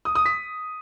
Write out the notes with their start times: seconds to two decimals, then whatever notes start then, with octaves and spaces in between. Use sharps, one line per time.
0.05 D#6
0.15 D#6
0.26 B6